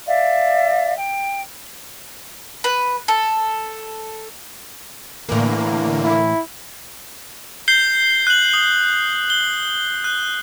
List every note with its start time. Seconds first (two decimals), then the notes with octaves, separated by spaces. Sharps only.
0.06 D5 E5 F5
0.96 G5
2.64 B4
3.08 A4
5.29 A2 D3 E3 A#3
6.05 E4
7.68 G6 C7 G7
8.27 F#6 F#7
8.53 D#6
9.30 G7
10.04 F#6